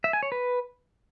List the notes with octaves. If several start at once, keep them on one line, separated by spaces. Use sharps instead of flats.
E5
G#5
C#5
B4